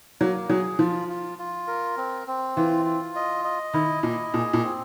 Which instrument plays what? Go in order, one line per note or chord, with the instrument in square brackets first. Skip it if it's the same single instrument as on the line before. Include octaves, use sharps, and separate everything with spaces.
[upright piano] F#3 [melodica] A#3
[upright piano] F#3 [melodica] G#4
[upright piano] F3 [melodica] F4
[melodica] F4
F4
A#4
C4
C4
[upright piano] E3 [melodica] F4
[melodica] F4
D#5
D#5
[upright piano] D#3 [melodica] E4
[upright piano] A#2 [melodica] D#5
[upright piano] A#2 [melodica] G#4
[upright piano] A#2
[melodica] C4